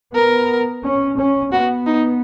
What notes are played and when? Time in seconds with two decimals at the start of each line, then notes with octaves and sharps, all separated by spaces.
0.14 B3 A#4
0.83 C#4
1.18 C#4
1.52 B3 F#4
1.86 D#4